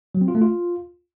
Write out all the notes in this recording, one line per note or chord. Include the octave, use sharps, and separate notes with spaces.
F#3
C4
F4
A3
F4